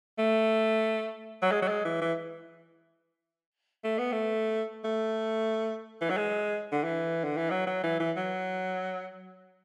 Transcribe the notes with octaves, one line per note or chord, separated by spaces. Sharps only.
A3
F#3
G#3
F#3
G#3
E3
E3
A3
B3
A3
A3
E3
F#3
G#3
D3
E3
D3
E3
F#3
F#3
E3
E3
F#3